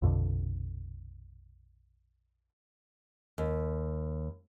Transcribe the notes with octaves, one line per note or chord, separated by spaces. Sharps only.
A#1 F2 B2 D3
D#2